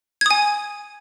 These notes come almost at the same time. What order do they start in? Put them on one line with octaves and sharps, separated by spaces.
G#6 D#6 G#5